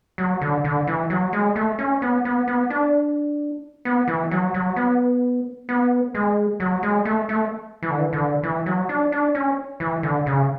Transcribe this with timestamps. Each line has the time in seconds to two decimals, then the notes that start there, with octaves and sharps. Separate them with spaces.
0.18 F#3
0.41 D3
0.64 D3
0.87 E3
1.10 F#3
1.33 G#3
1.56 A3
1.79 C#4
2.02 B3
2.25 B3
2.48 B3
2.70 D4
3.85 B3
4.08 E3
4.31 F#3
4.54 F#3
4.76 B3
5.69 B3
6.15 G#3
6.60 F#3
6.83 G#3
7.05 A3
7.29 A3
7.83 E3
7.91 D3
7.99 E3
8.13 D3
8.43 E3
8.66 F#3
8.89 D4
9.12 D4
9.35 C#4
9.80 E3
10.03 D3
10.26 C#3